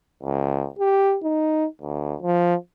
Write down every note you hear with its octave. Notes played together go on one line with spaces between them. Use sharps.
C#2
G4
D#4
D2
F3